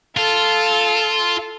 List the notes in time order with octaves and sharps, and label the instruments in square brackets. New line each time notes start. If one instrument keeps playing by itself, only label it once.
[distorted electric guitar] F4 [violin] A4